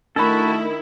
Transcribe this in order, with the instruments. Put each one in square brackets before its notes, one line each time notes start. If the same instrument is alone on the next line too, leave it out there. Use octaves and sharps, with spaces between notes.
[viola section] D#3 E4 [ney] A3 [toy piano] D4 B5 [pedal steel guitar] F#4 A4